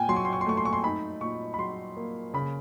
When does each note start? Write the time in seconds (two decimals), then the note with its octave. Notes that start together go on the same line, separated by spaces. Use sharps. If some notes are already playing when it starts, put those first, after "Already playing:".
Already playing: A#2 G5 G#5
0.09 F#3 C6
0.17 C#6
0.25 C6
0.33 C#6
0.41 C6
0.46 A3 C#6
0.57 C6
0.65 C#6
0.73 C6
0.84 D#4 B5
1.21 A#2 C#6
1.54 B5
1.58 F#3 C6
1.97 A#3
2.34 C#3 B5